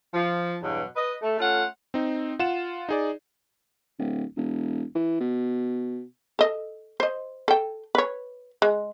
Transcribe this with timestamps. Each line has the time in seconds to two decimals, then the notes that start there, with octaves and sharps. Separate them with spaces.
0.14 F3
0.63 E2 G2 B2 F#3
0.96 B4 D#5
1.22 A3
1.38 A3 C#4 F4 F#5
1.94 C4 D#4
2.39 F4 F#5 E7
2.89 D#4 G#4 D5
3.99 D1
4.36 E1
4.95 E3
5.20 B2
6.39 A4 D#5
7.00 C5 D#5
7.48 A4 G5
7.95 B4 C#5
8.62 G#3